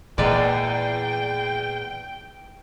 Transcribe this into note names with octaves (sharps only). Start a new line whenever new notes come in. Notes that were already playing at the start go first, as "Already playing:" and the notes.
E2 A#2 G#3 B4 D5 G5